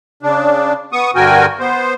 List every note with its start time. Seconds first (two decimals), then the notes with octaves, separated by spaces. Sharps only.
0.23 C#3 D4
0.93 B3 C#6 D#6
1.16 G2 D3 F#4 A#4 G5 G#5
1.60 B3 C5